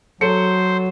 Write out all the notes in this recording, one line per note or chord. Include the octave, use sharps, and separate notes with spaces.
F#3 A4 C5 C#5 C#7